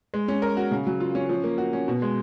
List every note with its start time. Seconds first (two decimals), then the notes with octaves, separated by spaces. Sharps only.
0.14 G#3
0.28 C#4
0.42 A#4
0.57 F#4
0.71 C#3
0.87 F#3
1.00 F4
1.15 C#4
1.29 F3
1.44 A#3
1.58 F#4
1.73 C#4
1.88 B2
2.02 G#3